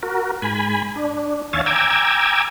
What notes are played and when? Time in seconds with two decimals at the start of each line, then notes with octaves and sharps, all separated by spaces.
0.03 F#4 A#4
0.42 G#2 G#5 B5
0.96 D4
1.53 D#2 C#5 E5 F5 G#5 A6
1.66 G5 G#5 A#5 D6 E6 G#6